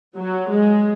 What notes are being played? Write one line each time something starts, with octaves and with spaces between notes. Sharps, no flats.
F#3
G#3